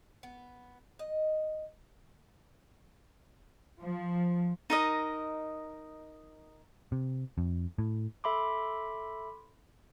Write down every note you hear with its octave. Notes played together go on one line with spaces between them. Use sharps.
B3
D#5
F3
D#4 A#4 D#5 A#5
C3
F2
A2
A4 E5 B5 C6 D6